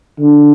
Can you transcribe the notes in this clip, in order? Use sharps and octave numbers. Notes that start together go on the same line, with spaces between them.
D3